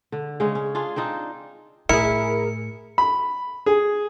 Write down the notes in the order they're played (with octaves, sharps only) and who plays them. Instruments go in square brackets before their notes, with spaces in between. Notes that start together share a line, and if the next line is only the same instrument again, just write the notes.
[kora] D3
C#3 G#3 C#4
C#4
D4 F4 G#4
C4 D4 D#4 F4
[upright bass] A2 [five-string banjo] E4 [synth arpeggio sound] G#4 A#4 [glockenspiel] C#7
[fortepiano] B5
G#4